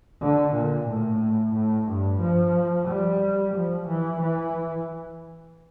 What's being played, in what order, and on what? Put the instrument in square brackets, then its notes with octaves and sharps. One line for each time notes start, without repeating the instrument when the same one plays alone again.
[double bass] D3
A#2
A2
A2
G2
F3
G3
F3
E3
E3